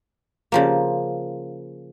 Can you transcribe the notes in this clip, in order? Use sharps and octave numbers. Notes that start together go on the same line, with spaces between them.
C#3 F3 A#3